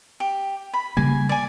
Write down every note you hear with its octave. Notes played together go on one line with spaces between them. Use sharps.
G4
B5
C#3 G3 A#3 G#5
D5 G#5